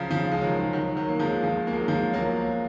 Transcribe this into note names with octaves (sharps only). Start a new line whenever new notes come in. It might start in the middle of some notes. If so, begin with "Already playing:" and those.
Already playing: C#3 F3 F#3
C#3 F3
G#3
D#3 F#3
D#3 F#3
D#3 F#3
A#3
F3 G#3
F3 G#3
A#3
G#3
F#3
F3 G#3
F#3 A#3